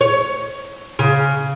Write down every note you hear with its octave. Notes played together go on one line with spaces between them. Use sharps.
C#5
C#3